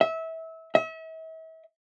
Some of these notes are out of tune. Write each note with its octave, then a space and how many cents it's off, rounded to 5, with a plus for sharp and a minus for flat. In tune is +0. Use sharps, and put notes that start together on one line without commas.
E5 -25
E5 -40